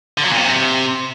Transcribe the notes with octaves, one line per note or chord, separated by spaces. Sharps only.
D3
F#3
A#2
C3